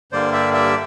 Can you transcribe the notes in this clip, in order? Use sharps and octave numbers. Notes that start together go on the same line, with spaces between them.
G2 D3 G3 A#3 C5 D5
D5 E5
D5 E5